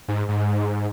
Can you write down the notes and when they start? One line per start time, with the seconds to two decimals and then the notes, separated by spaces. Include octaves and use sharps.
0.08 G#2
0.29 G#2